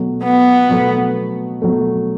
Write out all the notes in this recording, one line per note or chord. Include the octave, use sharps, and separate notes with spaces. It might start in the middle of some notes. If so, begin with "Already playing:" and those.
Already playing: B2 F#3 A3
B3
B2 F#3 A3
B2 F#3 A3